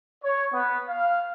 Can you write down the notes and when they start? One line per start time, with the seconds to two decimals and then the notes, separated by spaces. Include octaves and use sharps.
0.22 C#5
0.53 B3
0.89 F5